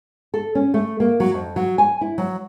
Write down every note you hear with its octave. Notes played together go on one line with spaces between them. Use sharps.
A4
C#4
A3
A#3
F#3
F2
F#3
G#5
E4
F#3